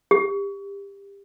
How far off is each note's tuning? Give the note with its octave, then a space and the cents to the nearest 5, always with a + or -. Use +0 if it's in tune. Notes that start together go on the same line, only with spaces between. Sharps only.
G4 +25